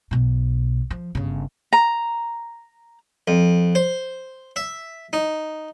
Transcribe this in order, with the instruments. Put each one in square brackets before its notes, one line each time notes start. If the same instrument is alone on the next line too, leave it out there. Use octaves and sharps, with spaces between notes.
[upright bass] B1 B2
F3
G1 C#3
[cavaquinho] A#5
[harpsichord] F2
C5
E5
D#4